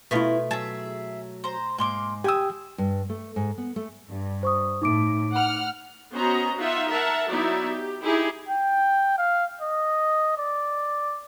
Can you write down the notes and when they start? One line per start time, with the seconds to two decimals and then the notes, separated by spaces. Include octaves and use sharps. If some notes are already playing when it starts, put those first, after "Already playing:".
0.11 B2 A3 B3 E4 F4
0.51 F#3 G#4 E5 A5
1.44 C5 A#5
1.78 G#2 A#3 C6 D6
2.24 G4 G5 G#5 D#6 E6
2.78 G2
3.10 A3
3.36 G#2
3.58 B3
3.76 A3
4.09 G2
4.43 C5 C#6 D#6
4.82 A2 D#4 D6 D7
5.34 F#5 F6
6.13 B3 C#4 F#4 C5 D#5 A#5
6.57 D#4 F4 E5 F#5
6.89 A#4 E5 F#5 A5
7.28 F#3 B3 D#4 E4 D5 E5
7.69 G4
8.01 D#4 E4 G4 G#4
8.49 G5
9.18 F5
9.61 D#5
10.37 D5